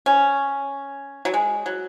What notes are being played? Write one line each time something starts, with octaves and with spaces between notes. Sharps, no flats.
C#4
F#3
G#3
F#3